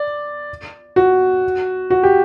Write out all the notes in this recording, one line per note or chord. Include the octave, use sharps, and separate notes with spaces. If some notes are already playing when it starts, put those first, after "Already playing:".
Already playing: D5
F#4
F#4
G4